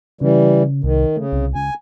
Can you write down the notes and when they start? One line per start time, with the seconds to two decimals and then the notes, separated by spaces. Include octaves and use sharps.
0.21 C#3 E3 G3
0.84 C2 D#3
1.17 C#3 A3
1.32 C2
1.55 C#2 G#5